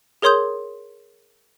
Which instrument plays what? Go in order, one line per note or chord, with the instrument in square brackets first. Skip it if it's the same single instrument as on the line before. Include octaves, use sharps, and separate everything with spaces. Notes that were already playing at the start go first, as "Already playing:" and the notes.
[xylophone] G#4 A#4 C#5 C6 D#6 G6